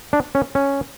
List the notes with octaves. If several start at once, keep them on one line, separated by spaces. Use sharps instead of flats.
D4
C#4
C#4